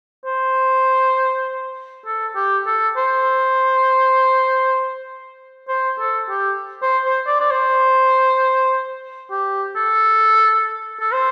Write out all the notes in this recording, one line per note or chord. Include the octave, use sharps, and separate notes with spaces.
C5
A4
G4
A4
C5
C5
A4
G4
C5
C5
D5
D5
C5
G4
A4
A4
C5